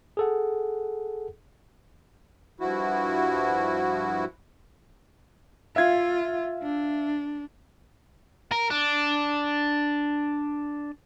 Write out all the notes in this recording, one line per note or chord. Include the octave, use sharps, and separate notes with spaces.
G#4 A4 F#5
G2 F3 E4 F#4
F4 E5 F5 G#6
D4
A#4
D4